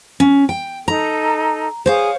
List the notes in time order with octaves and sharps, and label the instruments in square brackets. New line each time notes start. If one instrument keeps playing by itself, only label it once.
[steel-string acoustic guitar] C#4
G5
[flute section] D#4 A4 [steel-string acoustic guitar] A#5
[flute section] G#4 [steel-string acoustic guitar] C5 C#5 F5